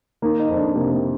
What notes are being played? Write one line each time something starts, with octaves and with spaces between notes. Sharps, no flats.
D#3 A#3
D#4
F2
D4
C3 A#3
A#3